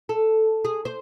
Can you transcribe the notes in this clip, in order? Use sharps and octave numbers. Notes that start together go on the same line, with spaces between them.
A4
G#4
C5